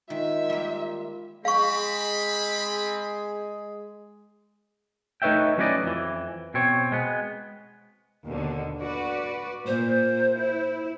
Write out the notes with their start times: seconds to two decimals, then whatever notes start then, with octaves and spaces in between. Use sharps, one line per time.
0.10 D#3 G#3 D#4 F4 E5
0.50 G3 A#3
1.45 G#3 C4 G#4 F5 B5 C#6
5.22 A3 D#4 B4 C#5 E5 G5
5.58 F#3 C#4 E4 B4 D5 D#5
5.83 F2 E3
6.54 B2 C4 C#5
6.92 G#3 B3
8.26 D#2 B2 D3
8.80 F#4 B4 D5
9.67 A#2 C5
10.34 E4